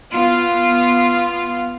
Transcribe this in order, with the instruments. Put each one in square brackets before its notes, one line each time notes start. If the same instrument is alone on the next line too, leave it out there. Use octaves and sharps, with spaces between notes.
[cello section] B3 F4